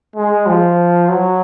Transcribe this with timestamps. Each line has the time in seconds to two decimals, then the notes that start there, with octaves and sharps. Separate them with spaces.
0.16 G#3
0.46 F3
1.09 F#3